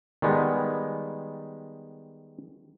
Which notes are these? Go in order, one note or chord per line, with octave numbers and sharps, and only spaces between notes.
D#3 G3 G#3 B3